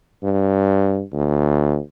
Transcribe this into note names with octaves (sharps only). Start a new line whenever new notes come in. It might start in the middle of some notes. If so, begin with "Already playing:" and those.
G2
D2